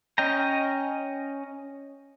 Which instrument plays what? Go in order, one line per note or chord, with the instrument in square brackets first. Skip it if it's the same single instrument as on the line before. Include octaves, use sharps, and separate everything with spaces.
[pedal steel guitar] C#4 D#5 G5 A#5